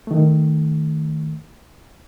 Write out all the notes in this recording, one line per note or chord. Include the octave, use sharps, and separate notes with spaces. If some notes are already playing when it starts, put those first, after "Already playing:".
D#3 A3